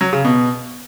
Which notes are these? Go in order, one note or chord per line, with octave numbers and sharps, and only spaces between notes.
F#3
C#3
B2